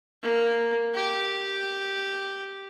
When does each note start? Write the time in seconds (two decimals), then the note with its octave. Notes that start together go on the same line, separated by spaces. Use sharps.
0.23 A#3
0.95 G4